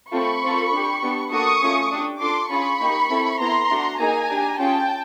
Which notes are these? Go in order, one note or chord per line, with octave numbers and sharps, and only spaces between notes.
A3 C4 F4 A4 B5 C#6
C4 F4 A4
D4 G4
B3 D4 G4
A#3 D4 F#4 A4 C#6 D#6
A3 C#4 F4 G#4
D4 G4
D4 F4 A4 C6 D6
C#4 F4 G#4 B5 C#6
A#3 D#4 G4
C4 E4 A4
B3 E4 A4 A#5 C6
A3 D4 F#4
A#3 D#4 G#4 G#5 A#5
D4 G4
C#4 F4 G#4 G5 A5